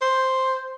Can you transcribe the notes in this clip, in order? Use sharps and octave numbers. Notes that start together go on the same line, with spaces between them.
C5